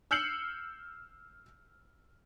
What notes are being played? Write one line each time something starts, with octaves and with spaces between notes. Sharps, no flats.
E6 F6 G6 C7 C#7 F#7